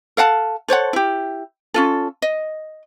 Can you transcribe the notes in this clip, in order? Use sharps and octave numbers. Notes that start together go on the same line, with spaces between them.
A4 F5 F#5 A5
A4 C5 C#5 F#5
E4 G4
C#4 F4 A4
D#5